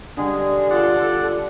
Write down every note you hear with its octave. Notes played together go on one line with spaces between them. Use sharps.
D3 G3 G#3 G#4
F4 A4 D5 F#5